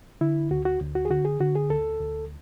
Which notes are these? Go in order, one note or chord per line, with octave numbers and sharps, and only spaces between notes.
D3 E4
D2 F#4
F#4
D2
F#4
G#4
D3 F#4
G#4
D3 F#4
G#4
D2 A4
D2